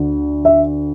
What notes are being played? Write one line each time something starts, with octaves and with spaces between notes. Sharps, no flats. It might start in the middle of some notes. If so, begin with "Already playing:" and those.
Already playing: D2 D3
E5